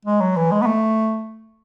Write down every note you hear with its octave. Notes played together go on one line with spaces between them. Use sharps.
G#3
F#3
E3
G#3
B3
A3